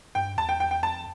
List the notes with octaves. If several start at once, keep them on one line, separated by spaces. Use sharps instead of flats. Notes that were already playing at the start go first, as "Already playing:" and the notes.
G2 G5
E2 A5
G5
G5
G5
F2 A5